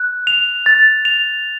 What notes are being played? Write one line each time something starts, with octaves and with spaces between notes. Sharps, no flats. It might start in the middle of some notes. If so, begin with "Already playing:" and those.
Already playing: F#6
F7
A6
F7